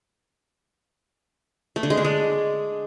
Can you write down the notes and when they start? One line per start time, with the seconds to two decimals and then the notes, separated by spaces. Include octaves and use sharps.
1.76 A3
1.83 D3
1.90 G#3
1.97 D4
2.05 G#3